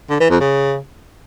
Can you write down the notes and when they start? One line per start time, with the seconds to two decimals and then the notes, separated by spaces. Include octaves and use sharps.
0.10 D3
0.20 E3
0.30 F2
0.40 C#3